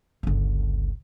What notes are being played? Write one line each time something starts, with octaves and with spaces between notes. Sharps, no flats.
G1 C#2